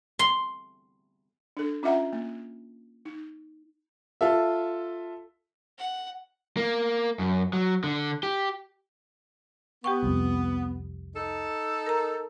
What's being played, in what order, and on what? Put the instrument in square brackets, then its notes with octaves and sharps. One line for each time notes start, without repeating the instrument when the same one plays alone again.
[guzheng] C6
[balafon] D4 A4
C#4 F4 D#5 E5 F#5 A#5
A#3
D#4
[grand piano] F4 A4 E5
[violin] F#5
[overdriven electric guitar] A#3
F#2
F#3
D3
G4
[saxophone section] B3 [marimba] G4 G5 C#6
[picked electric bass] C2 F2
[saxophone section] D#4 A4
[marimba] A#4 A#5